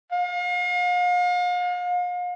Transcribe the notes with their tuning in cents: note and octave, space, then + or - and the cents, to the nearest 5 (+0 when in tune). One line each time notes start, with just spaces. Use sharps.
F5 +40